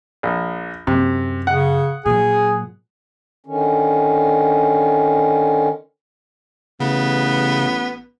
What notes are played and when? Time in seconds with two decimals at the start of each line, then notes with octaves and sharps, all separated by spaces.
0.23 A#1
0.87 F#2 C3
1.47 C#3 F#5
2.06 A#2 F#3 G#4
3.46 D3 D#3 C#4
6.80 A1 C#3 B3